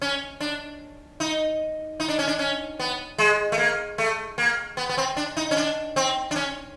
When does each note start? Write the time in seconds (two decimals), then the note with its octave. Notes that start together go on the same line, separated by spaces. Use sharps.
0.02 C#4
0.40 D4
1.20 D#4
2.00 D#4
2.08 D4
2.19 C#4
2.28 D4
2.39 C#4
2.79 B3
3.18 G#3
3.52 A3
3.58 A#3
3.98 A3
4.38 A#3
4.77 B3
4.89 B3
4.97 C4
5.17 D4
5.37 D#4
5.51 C#4
5.57 D4
5.96 C4
6.31 D4
6.36 C#4